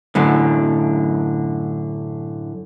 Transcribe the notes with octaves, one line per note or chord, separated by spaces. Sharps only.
F#2 A2 D3